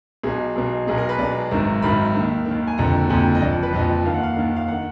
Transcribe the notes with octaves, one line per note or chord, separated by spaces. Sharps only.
B1 B2 G#4
B1 B2
B1 B2 G#4
A#4
B4
B1 B2 D5
G#1 F#2 D#3 A#5
G#1 F#2 D#3 B5
D#2 D#3
D#3
D#2
G#5
F#1 F2 D3 A#5
F#1 F2 D3 G#5
D#5
F#1 F2 F3 D5
B4
F#1 F2 F3 D#5
D#2 D#3 F5
F#5
F5
D#2 D#3
F5
D#3 F#5